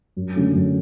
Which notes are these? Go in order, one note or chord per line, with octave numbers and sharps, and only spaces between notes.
F#2
D3 F#3 A3 C#4
F#2